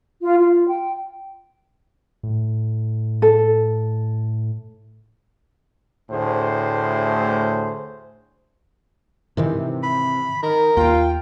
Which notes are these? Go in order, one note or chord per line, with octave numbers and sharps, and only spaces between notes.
F4
F4
G5
A2
A4
D2 A2 G#4 C5
G#2 C3 D#3 E3
B5
D#3 A#4
D#2 F4 G5